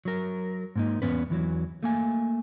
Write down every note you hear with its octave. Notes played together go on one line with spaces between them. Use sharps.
F#3 A#4
G#2 A#3 D#4
E2 B3 C#4 B4
E2 E3 F#3
A3 A#3 G#5